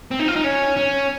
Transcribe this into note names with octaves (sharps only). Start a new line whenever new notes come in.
C4
D#4
F4
D#4
C#4
C#4